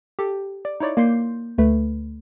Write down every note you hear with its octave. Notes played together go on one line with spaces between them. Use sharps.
G4 A4
D5
D#4 E4 C#5 D5
A#3 D5 C6 G6 C7
D2 A3 B4